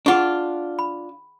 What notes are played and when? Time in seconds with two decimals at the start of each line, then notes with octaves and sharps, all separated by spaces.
0.06 D4 F4 G#4 F#5 C#6
0.79 B5